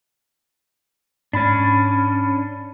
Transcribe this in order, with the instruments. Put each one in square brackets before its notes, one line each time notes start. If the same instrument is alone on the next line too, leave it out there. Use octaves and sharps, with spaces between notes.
[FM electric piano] G#2 B5 A6 [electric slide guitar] C#4 D4